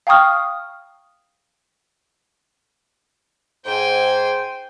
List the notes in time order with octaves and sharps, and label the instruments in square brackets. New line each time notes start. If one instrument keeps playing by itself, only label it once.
[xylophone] F5 G5 A#5 C#6 D#6 F6
[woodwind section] G#2 C5 [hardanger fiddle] G5 G#5